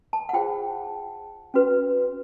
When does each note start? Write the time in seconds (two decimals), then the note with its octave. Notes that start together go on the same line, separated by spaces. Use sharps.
0.13 A5
0.29 F#5
0.33 F4 G#4 C5 G5
1.54 C#4 F#4 B4